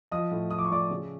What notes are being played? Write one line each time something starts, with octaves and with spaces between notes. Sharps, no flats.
F3 D#5 D#6
A2
F3 D#6
D6
C#6
A2 D5 D6
C#3